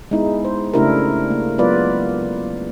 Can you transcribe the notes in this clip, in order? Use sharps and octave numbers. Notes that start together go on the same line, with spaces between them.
G#3 B3 D#4 E4
C5
C#3 A3 D4 E4 G4 A#4
A#3
F#3 G#3 B3 F4 B4 D5